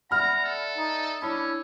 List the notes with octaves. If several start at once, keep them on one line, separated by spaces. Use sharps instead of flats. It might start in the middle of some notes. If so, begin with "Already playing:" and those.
D5 E5 F#5 A#5 B5 F6
A4
D#4
C#4 D4 E4 C#5 B5 E6